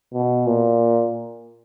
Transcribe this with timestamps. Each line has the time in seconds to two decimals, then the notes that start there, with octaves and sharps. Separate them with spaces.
0.14 B2
0.46 A#2